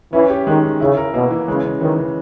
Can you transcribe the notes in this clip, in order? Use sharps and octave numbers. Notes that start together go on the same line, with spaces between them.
E3 C#4
G4
D#3 G#3
D#3
C#3 E4
A#4
B2 A#3
E3
C#3 G#3
C#3
D#3 E3
C#3